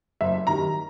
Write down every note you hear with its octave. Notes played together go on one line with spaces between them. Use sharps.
F#1 E5
F#2 D#3 G3 A#5